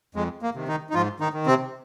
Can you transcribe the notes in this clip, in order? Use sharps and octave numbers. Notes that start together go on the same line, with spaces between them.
F2 G#3
A#3
C3 D#3
D#3 D#4
D#4
G#2 F3 F4
D#3 D#4
D#3
C3 C4